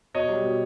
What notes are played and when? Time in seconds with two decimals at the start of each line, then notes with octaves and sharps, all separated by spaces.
0.14 B2 C#5 D#5
0.29 G3
0.44 B2